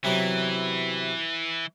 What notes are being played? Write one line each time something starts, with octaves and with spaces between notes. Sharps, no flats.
C3 E3 F#3 B3